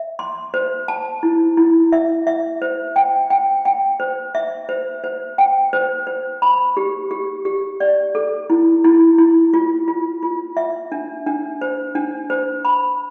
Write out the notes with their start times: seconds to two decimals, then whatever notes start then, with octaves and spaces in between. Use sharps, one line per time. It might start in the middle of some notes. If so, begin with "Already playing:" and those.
Already playing: E5
0.19 C6
0.54 C5
0.88 A5
1.23 E4
1.57 E4
1.92 E5
2.27 E5
2.62 C5
2.96 G5
3.30 G5
3.65 G5
4.00 C5
4.35 E5
4.69 C5
5.04 C5
5.38 G5
5.73 C5
6.07 C5
6.42 B5
6.77 G4
7.11 G4
7.45 G4
7.80 D5
8.15 A4
8.50 E4
8.84 E4
9.18 E4
9.54 F4
9.88 F4
10.23 F4
10.57 E5
10.92 D4
11.27 D4
11.61 C5
11.95 D4
12.30 C5
12.65 B5